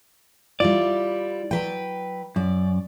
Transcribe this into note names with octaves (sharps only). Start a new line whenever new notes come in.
G3 E4 F4 D5
F#3 B4 G5
F#2 D5